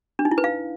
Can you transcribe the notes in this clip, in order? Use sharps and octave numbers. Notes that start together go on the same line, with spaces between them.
D4
D#4
E4
B4
F5